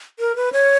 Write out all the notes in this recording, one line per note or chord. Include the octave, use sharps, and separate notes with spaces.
A#4
B4
C#5